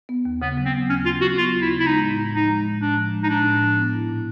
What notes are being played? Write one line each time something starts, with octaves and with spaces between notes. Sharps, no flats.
B3
D#2
C#3 B3
F#3
C4
B3
D#2 C#4
C#3 F4
F#3 F#4
B3 F4
D#2
E4
C#3
E4
G#3 D#4
A2
A2
F3 D#4
G#3
A2
A2 D4
F3
G#3
D#4
A2 D4
A2
F3
B3
E4
A#2